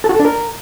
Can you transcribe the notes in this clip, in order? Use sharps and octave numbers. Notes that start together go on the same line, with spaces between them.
A4
F#4
A4
D4
A#4